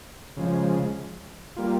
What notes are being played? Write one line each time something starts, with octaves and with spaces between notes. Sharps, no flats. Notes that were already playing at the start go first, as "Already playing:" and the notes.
C#3 F3 G#3
G3 A#3 F4